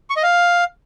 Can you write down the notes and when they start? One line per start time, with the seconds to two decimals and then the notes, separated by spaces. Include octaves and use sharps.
0.10 C#6
0.16 D#5
0.23 F5